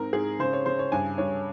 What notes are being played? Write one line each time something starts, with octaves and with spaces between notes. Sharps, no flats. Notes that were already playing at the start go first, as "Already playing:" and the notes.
Already playing: G#2 C4 A#4
G#2 G#4
C#3 C5
C#5
C#3 C5
C#5
G2 G#5
G2 C#5